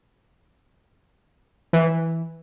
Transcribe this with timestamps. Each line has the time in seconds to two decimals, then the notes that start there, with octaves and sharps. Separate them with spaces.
1.73 E3